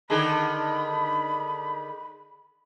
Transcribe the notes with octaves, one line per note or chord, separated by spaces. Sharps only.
D3 D#3 G#4 B5